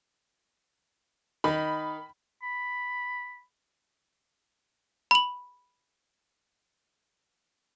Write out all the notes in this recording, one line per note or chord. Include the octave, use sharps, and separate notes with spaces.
D#3 D#4 B5
B5
B5 F#7